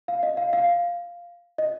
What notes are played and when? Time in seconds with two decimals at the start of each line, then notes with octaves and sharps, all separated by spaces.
0.08 F5
0.23 D#5
0.37 F5
0.53 F5
1.58 D#5